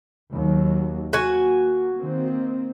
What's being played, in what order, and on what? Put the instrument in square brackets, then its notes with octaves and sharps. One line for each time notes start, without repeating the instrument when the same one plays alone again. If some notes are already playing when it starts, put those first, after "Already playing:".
[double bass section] D#2 F#3
[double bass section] A#3 [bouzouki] F#4 G#5
[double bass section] D#3 A#3 C4